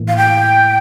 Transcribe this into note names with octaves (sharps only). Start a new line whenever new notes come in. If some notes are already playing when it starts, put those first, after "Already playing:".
Already playing: A2 E3 A#3
F5
G5